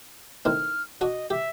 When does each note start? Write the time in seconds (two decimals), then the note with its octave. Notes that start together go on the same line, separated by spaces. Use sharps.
0.45 A2 D#3 C4 F6
1.01 D4 F#4 D#5 D#6
1.30 G4 E5